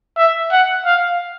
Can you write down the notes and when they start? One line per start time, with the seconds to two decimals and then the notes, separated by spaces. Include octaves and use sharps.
0.17 E5
0.52 F#5
0.86 F5